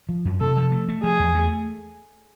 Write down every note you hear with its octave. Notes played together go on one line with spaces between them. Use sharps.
F3
F#2
C3 A4
F3
A3
A3
F3 G#4
E2
A3